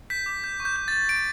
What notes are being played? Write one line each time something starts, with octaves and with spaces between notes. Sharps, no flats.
G6 B6
D6
G6
C#6
G6
G6
G6 A6
G6 D7